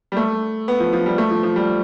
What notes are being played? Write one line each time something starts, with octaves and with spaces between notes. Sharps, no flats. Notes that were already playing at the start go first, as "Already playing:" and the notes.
G3
A3
B3
F3
F3
G3
A3
F3
F3
G3